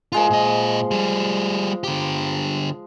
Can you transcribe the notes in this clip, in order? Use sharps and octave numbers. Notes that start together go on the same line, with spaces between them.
F3 G#3 F4 A#4 C6
A#2 D#5
G3 G#4
D3 G4